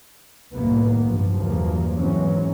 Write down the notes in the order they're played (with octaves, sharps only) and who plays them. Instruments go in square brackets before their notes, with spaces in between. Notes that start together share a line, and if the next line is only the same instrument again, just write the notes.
[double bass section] C2 F#2 A2 D#3 A#3 B3
G2 F3
E2 G2 C#3 F3 F#3 A#3
G#2 E3 F#3 C4 C#4